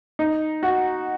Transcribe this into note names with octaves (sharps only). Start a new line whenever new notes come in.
D#4
F#4